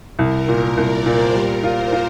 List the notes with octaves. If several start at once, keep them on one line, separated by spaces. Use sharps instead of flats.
C2 A#4
A#2 A#4
C2 D5
A#2 C5
G3 A#4
F4 C5
F4